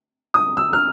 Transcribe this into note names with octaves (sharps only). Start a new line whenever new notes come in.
D#6
E6
F6